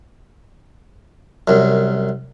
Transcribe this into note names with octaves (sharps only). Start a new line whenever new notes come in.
C2 F#2